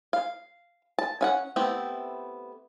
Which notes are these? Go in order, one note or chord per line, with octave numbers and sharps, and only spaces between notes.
F5
A5
C#4 F5 F#5
A3 B3 C4 E4 G4